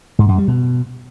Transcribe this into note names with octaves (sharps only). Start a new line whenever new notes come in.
G#2
F#2
G3
B2